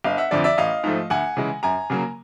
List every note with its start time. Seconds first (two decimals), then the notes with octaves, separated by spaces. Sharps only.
0.04 G1 D#5 F5
0.18 E5 F#5
0.31 F2 D3 F3 D5 E5
0.44 D5 E5
0.58 A1 D#5 F5
0.84 G#2 F3 A3
1.10 D2 F#5 G#5
1.37 C#3 E3 G#3
1.63 F#2 G#5 A#5
1.90 C#3 F#3 A#3